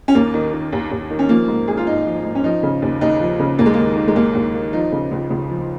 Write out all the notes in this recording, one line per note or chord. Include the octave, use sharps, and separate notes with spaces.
C#4
D#2 A#3
D#3
D#3
D#2
D#2
D#3
C#4
F3 A#3
G#2
G#1 G#4
F4
G#1 D#4
F3
G#2
C#4
F3 D#4
C#3
D#2
D#2 D#4
F3
C#3
D#2 A#3
G#3
D#3 A#3
D#3
G#3
D#2 A#3
D#2
D#3
F3 D#4
C#3
C#2
C#2
F3